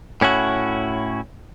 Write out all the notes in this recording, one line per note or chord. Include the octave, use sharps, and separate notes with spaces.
A2 C#4 E4 F#4